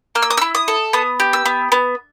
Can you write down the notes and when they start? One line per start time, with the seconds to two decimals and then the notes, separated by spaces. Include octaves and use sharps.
0.15 A#3 F6
0.22 E6
0.30 D#6
0.37 E4 E6
0.55 D#6
0.68 A4
0.93 B3 D#6
1.20 G4
1.33 E6
1.45 B3
1.72 B3